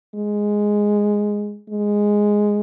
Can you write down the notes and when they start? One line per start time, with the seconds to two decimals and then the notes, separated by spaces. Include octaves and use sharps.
0.15 G#3
1.69 G#3